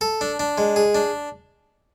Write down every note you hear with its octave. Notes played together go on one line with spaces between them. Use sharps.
A4
D4
D4
G#3
G#4
D4